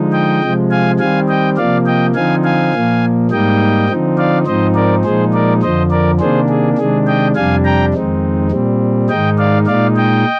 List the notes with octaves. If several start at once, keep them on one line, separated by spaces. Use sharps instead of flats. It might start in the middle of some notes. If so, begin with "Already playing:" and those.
Already playing: D3 F3 G#3 D#4
D#5 G5
C3 F3 G#3
F5 G#5
D#3 G3 C4 F5 G#5
D#5 G5
C3 F3 A#3 D5 F5
D#5 G5
D3 F3 C4 D#4 F5 G#5
F5 G#5
A#2 F3 A#3
G#2 G3 A#3 D#4 D#5 G5
D3 F3 C4 D#4
D5 F5
G#2 F3 C4 D#4 C5 D#5
A#4 D5
A#2 F3 G#3 D#4 G#4 C5
A#4 D5
F2 D3 F3 C5 D#5
A#4 D5
C3 D#3 A#3 D4 G#4 C5
G#4
C3 D#3 G#3 D4 G#4
D#5 G5
F2 C3 G3 D4 F5 G#5
G5 A#5
F2 D#3 G#3 C4 D#4
A#2 G3 C4
G#2 D#3 G#3 D#4 D#5 G5
D5 F5
A#2 G#3 D#4 D5 F5
D#5 G5